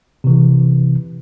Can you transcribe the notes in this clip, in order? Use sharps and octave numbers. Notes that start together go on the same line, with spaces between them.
C3 E3